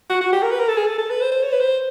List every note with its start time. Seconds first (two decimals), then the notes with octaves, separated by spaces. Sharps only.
0.10 F#4
0.21 F#4
0.32 G4
0.42 A#4
0.51 B4
0.60 A#4
0.68 A4
0.77 G#4
0.87 A4
0.98 A4
1.10 B4
1.21 C5
1.31 C5
1.43 C#5
1.52 B4
1.60 C5